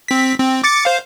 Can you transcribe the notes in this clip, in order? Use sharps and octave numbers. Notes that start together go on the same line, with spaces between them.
C4 B6
C4
D6 A6 C#7
C5 F5